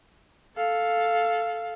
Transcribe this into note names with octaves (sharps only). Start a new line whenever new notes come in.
A4 F5